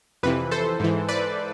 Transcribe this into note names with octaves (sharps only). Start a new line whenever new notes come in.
F2 C3 E3 B4
A4 C5
G#2 E3
B4 D5